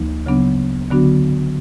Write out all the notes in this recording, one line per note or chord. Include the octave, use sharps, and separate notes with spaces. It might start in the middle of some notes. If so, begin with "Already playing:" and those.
Already playing: D2 F3 A#3 D#4
C#3 F#3 B3 D4
D3 F#3 B3 D4 F#4